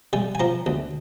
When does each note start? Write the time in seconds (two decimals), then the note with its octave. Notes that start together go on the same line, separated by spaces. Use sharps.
0.13 G3 G#5
0.35 G#5
0.40 F3 A#5
0.66 D2